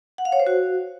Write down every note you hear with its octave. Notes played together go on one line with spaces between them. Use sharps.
F#5
F5
C#5
C5
F#4